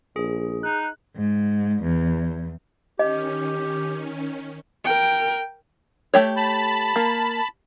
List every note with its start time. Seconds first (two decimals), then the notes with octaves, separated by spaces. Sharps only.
0.16 A#1 G#4
0.63 D#4 F#6
1.16 G#2
1.83 E2
2.99 D#3 C#4 G4 D#5
4.85 A#4 G5
6.14 A3 G4 C#5
6.36 A5 B5
6.96 A#3